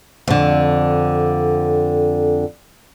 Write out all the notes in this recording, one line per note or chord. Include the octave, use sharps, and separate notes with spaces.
F2 D3